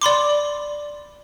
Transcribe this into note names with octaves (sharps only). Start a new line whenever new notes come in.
D5 B5 C6 D6